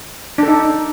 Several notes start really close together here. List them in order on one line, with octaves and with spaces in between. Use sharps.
D4 A4 D#4